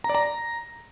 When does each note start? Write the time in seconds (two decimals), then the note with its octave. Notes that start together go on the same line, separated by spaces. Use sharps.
0.04 A#5
0.09 D5
0.15 A#5